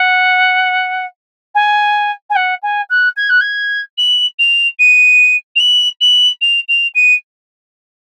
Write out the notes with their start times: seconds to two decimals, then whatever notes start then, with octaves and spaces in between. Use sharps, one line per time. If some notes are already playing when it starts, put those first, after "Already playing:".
Already playing: F#5
1.55 G#5
2.30 G#5
2.36 F#5
2.63 G#5
2.90 F#6
3.16 G#6
3.29 F#6
3.41 G#6
3.98 F#7
4.39 F7
4.79 D#7
5.56 F7
5.60 F#7
6.01 F#7
6.41 F7
6.68 F7
6.95 D#7